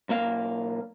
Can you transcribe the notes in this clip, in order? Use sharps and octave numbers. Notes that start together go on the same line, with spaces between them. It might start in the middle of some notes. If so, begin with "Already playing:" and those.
B1 A#3 F5